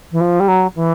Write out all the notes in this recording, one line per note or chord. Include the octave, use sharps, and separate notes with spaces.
E3
F3
G3
F#3
E3